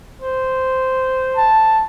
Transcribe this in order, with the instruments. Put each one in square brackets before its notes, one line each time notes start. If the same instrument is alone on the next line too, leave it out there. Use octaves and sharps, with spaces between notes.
[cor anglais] C5
[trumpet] A5